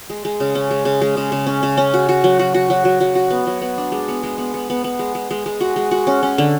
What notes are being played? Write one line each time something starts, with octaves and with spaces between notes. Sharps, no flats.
G#3
G#3
C#3
C#4
G#3
C#3
G#3
C#3
C#3
C#4
C#3
C#4
F#4
F#4
F#3
F#4
F#4
F#3
F#3
F#3
F#4
B3
F#3
B3
D4
G#3
B3
G#3
B3
B3
B3
B3
G#3
G#3
G#3
G#3
F#4
G#3
F#4
C#4
C#4
D3